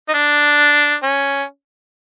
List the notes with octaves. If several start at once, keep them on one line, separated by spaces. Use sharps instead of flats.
D#4
D4
C#4